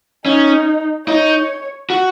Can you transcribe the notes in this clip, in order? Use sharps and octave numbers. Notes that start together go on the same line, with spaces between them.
C#4 D#4
D#4 C#5
F#4